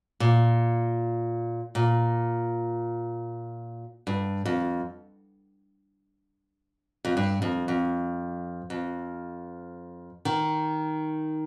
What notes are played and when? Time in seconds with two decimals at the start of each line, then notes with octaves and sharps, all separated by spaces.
0.20 A#2
1.75 A#2
4.07 G2
4.45 F2
7.05 F2
7.17 G2
7.42 F2
7.68 F2
8.70 F2
10.25 D#3